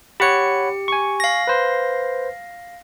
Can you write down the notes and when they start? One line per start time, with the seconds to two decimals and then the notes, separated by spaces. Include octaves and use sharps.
0.20 G4 C#5 F#5 B5 C#7
0.88 G#5 C#6
1.20 F5 A#6
1.47 B4 C5